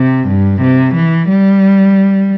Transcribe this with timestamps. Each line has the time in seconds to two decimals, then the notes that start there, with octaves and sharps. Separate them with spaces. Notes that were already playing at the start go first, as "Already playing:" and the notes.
Already playing: C3
0.28 G2
0.61 C3
0.95 E3
1.29 G3